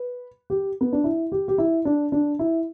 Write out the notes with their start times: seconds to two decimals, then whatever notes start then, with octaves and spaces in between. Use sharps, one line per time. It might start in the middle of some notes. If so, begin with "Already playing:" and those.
Already playing: B4
0.50 G4
0.81 B3
0.93 D4
1.04 E4
1.32 G4
1.48 G4
1.58 E4
1.85 D4
2.12 D4
2.39 E4